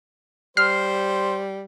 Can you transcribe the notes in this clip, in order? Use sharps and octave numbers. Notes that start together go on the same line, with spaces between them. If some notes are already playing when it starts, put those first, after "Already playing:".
G3 C5 F6 C7